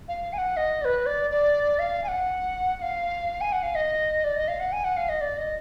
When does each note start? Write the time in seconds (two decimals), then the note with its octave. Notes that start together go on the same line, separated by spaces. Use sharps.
0.08 F5
0.33 G#5
0.38 F#5
0.57 D#5
0.81 D5
0.85 B4
1.06 D5
1.31 D5
1.79 F5
2.04 G#5
2.08 F#5
2.77 F#5
2.82 F5
3.41 G#5
3.52 F#5
3.63 F5
3.75 D#5
4.24 D5
4.36 D#5
4.48 F5
4.60 F#5
4.72 G#5
4.84 F#5
4.97 F5
5.09 D#5
5.21 D5
5.38 D#5